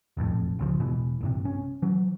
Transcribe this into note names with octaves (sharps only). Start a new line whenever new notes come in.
E1 A#1 F2 A2
G1 C#2 F3
E1 B2 E3
A#1 G2 C3
C#4
E3 F#3